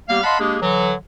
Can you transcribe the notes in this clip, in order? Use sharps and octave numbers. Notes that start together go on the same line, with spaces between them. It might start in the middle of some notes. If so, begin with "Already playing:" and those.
G3 A#3 B3 G4 F5
D#5 F5 F#5 A5 B5 C6
G#3 A#3 D4 G4 G#4
D3 E3 F#3